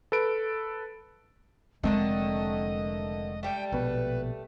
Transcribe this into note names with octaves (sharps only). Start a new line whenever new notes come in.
A4 B4 D7
F1 D3 D#3 G#3 A3 C4 D#5
G3 A3 G5
A#1 B2 B4